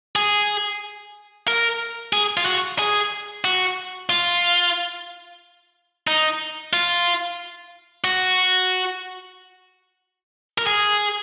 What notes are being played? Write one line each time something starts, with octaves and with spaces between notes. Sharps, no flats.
G#4
A#4
G#4
F4
F#4
G#4
F#4
F4
D#4
F4
F#4
A#4
G#4